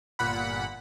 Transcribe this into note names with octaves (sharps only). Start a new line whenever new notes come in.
G1 A#2 F#5 B5